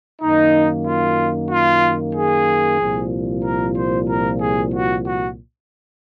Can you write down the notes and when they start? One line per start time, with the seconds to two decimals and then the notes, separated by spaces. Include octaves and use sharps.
0.22 F#2 D#3 A#3 D#4
0.86 F4
1.51 F4
2.15 G#4
2.81 C2 A#2 F3
3.44 A#4
3.77 C5
4.08 A#4
4.41 G#4
4.74 F#4
5.06 F#4